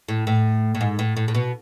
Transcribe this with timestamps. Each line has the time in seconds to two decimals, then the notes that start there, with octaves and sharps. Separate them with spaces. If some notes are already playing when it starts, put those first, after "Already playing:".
0.08 A2
0.27 A2
0.75 A2
0.81 G#2
0.99 A2
1.17 A2
1.28 A2
1.35 B2